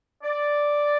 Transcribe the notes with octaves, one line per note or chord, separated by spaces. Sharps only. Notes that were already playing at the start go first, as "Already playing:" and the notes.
D5